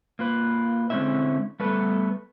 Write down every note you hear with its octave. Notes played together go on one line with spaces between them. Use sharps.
A#3 F4 B4
D3 G#3 C4 C#4 E4 E5
G3 A3 B3 A4 B4